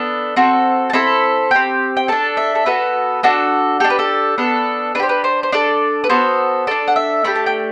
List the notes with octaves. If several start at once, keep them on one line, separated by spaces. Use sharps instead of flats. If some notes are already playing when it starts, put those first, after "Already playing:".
Already playing: B3 D4 A4
C4 F#4 A4
A5
C4 E4 A4 B5
C4 G4
G5
D4 A4 A5
E5
A4
B3 F#4 A4 B4
D4 F#4 A4
D4 G4 A4
B4
A4
B3 D4 A4
D4 G4 B4 C5
B4
C5
C5
D4 A4 D5
B4
B3 F#4 A4 C5
D4 A4 D5
F#5
E5
A3 D4 G4 B5
A5
G5